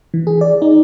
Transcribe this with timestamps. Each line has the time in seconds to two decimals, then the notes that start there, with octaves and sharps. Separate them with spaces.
0.14 E3
0.27 G#4
0.41 D5
0.62 D#4